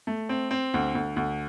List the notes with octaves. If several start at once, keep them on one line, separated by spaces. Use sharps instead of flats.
A3
C4
C4
D2
D2
D2